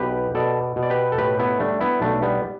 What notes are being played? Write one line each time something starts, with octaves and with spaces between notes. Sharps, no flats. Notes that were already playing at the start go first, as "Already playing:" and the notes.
Already playing: B1 B2 G4 B4
B2 A4 D5
B2
D5
G4 B4
A4
A2 G4 B4
B3 E4
G3 A3 D4
B3 E4
B1 A3 D4
G3 B3